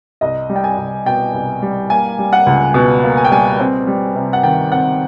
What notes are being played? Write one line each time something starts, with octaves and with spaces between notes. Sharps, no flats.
C2 D#5
G3
G5
G#5
C2
B2 G5
C2
G3
A#3 G#5
G3
F#5
C#2
B2
A#3
G#5
G5
G3 G#5
C4
G3
C3
F#5
D#3 G5
C4 F#5